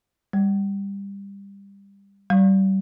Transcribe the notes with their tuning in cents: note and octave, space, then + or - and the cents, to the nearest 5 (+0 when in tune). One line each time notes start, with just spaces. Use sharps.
G3 +20
G3 -30